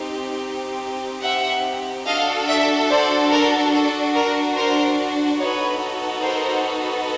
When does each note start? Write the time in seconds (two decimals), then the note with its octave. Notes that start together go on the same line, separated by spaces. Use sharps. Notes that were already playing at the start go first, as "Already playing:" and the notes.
Already playing: C4 D#4 G4
1.22 E5 F#5
2.06 D4 F#4 A4 D#5 F5
2.47 D5 E5
2.90 C5 D5
3.31 A#4
3.73 A4
4.14 A#4
4.56 A#4 C5
5.39 B3 D#4 F#4 A4 B4 C#5
6.23 A#4 C5